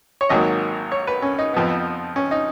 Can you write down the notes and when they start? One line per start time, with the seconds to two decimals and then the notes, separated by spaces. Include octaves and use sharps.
0.21 C#5
0.29 G#1 G#2 F#3 A#3 D#5
0.92 C#5
1.07 B4
1.22 C#4
1.39 D#4
1.54 F2 F3 B3
2.16 C#4
2.31 D#4